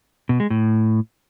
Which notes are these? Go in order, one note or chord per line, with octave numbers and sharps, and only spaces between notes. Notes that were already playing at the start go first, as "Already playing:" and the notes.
B2
G#3
A2